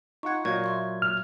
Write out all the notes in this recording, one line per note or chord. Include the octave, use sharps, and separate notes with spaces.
D#4 F4 F#5 C#6 G#6
A#2 F#3 D#5 F5 C#6 G#6
E5 C6 C#6
F6